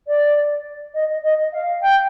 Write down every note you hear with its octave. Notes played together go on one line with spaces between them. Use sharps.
D5
D#5
D#5
F5
G5